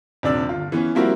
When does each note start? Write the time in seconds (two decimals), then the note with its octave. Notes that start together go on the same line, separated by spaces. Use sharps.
0.23 D#1 C3 D4 D5 E6
0.49 G1 F4
0.72 E3 B3 C#4
0.95 F3 G3 A#3 C4 E4 F#4